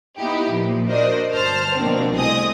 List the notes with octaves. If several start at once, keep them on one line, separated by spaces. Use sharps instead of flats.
B3 D#4 E4 G4
A#2 F3
D4 F#4 A#4 C5 D5 D#5
G1 C5 A5 F6
B2 F3 A#3 C4 D4
C2 A3 C4 D#5 G#5 D#6